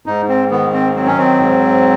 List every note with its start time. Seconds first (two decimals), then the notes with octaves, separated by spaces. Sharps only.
0.06 G#2 D#4
0.29 C4
0.50 D#3 B3
0.73 C4
0.96 F#3 C4
1.07 C#4
1.18 C4
1.40 G#2